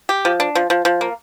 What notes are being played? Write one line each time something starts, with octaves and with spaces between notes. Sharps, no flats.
G4
F3
D4
F3
F3
F3
A#3